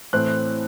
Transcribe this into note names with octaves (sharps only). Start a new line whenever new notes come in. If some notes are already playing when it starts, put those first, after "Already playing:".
A2 E3 A3 C4 F#6